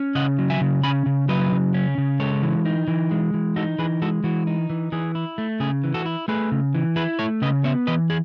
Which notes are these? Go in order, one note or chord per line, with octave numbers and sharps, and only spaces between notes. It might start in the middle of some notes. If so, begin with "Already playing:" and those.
Already playing: C#4
C#3 D#5 F#5
F#3
E5 G#5
C#3
C#4 G#5 B5
C#3
F#3 B4 D#5
C#3
C#4
C#3
G#3 A4 C#5
E3
D#4
E3
G#3
E3
D#4 F#4 A4
E3 G#4 B4
G#3 F#4 A4
E3 F#4
D#4
E3
E3 G#4
E4
A3
C#3 G#4
E3
F#4 A4
E4
A3 G#4 B4
C#3
E3
E4 G#4 B4
A3 A4 C#5
C#3 B4 D#5
B3 C#5 E5
E3 B4 D#5
G#4